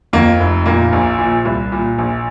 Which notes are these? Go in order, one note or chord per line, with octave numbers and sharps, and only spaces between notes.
F2 A#3
F1
A#2 A#3
A#1
A#2
C2
A#2
A#1